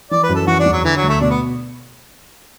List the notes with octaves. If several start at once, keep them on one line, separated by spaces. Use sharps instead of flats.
E3 D5
B4
F#2
A4
E3 F#4
D4
E2
F#3
D3 E3
F#3
D2
A3
B2 D4
B3